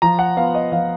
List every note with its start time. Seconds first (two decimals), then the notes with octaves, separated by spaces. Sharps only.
0.02 F3 A#5
0.19 F#5
0.37 B3 F4 F5
0.55 D#5
0.72 F3 F5